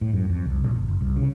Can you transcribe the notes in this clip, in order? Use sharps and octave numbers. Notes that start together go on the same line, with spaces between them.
A2
F#2
F2
C2
A#1
F#1
F#1
C2
C#3